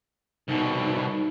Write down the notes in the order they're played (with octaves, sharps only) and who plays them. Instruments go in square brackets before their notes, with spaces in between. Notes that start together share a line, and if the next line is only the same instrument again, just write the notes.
[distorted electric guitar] C2 B2 [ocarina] D#4